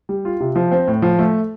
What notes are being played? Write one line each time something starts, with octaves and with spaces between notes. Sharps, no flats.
G3
F4
C3
F3
C4
A2
F3
A3